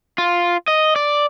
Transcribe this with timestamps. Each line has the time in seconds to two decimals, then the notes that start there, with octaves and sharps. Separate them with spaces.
0.18 F4
0.68 D#5
0.96 D5